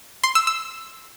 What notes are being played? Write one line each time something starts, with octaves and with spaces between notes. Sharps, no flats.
C6
E6
E6